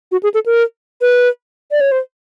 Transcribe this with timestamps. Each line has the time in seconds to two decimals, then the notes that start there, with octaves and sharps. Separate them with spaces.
0.12 F#4
0.23 G#4
0.34 A4
0.46 A#4
1.01 B4
1.71 D5
1.81 C#5
1.92 C5